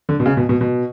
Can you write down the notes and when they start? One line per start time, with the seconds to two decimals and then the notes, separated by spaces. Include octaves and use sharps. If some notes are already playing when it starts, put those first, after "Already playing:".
0.09 D3
0.20 B2
0.26 C#3
0.37 B2
0.49 B2
0.61 B2